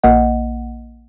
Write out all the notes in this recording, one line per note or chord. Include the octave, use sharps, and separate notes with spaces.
A#1 A#3 D#5 F#5